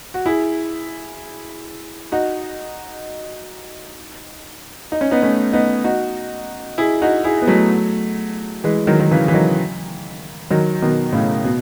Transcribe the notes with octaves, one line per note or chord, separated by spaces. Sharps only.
F#4
E4 G#4
D#4 F#4
D#4
C#4
B3 D#4
A3 C#4
B3 D#4
D#4 F#4
E4 G#4
D#4 F#4
E4 G#4
B3
F#3 A3
E3 G#3
D#3 F#3
D#3
C#3 E3
E3
D#3 F#3
D#3 F#3
B2 D#3
A2 C#3
B2